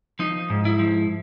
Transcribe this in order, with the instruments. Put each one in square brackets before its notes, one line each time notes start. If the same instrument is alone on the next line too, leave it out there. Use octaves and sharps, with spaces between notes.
[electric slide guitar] F3 D#4
G#2
E4
F3